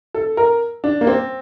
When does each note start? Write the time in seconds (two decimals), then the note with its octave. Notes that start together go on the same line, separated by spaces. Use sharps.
0.14 A4
0.37 A#4
0.84 D4
1.01 A#3
1.07 C4